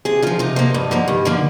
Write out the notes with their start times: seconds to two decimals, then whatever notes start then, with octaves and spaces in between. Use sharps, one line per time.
0.05 C3 G#4
0.22 F3 A#3 F4
0.39 C3 D#4
0.56 F3 A#3
0.74 G2
0.91 D3 F3 A#3
1.08 G2
1.25 D3 F3 A#3